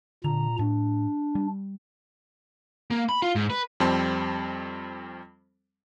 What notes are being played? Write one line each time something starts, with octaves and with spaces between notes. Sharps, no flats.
A#2 D3 A#5
A2 D4
G3
A#3
B5
F4
G#2
B4
F2 G3 C4 A5 C6